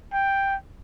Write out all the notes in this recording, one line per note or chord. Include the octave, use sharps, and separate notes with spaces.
G5